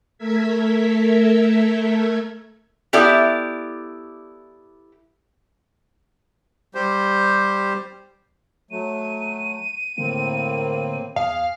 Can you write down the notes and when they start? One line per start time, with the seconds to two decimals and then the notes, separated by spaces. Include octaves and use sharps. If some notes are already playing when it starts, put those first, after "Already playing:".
0.18 A3 A4 A#4 E5 G#6 B6
2.93 B3 E4 G4 A4 D5
6.75 G3 G4 C5
8.71 F#3 A3 D#7
9.98 A2 D3 A#3 C4
11.16 E2 G#4 F5